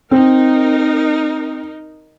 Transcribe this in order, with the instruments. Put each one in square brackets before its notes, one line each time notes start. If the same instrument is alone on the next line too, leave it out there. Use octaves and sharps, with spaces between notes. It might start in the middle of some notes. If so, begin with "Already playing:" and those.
[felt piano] C4 [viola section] D#4 A#4